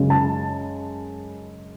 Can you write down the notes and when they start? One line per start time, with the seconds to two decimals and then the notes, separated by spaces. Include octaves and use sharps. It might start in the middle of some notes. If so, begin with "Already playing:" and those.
Already playing: F#2 C#3 G#3 C#4
0.10 A5